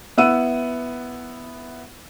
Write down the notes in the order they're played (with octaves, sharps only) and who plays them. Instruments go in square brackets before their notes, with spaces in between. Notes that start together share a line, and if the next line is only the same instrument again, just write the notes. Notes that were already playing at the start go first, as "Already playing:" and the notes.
[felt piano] B3 E4 F#5 E6 D#7